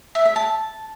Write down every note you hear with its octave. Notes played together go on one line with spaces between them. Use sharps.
E5
E5
A5